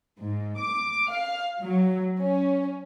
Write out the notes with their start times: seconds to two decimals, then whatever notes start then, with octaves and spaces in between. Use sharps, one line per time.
0.19 G#2
0.59 D6
1.09 F5
1.61 F#3
2.20 C#4